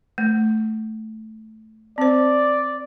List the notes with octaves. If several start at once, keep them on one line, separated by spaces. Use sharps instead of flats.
A3
C4 C5 D5